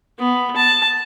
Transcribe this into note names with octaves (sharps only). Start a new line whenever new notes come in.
B3
A5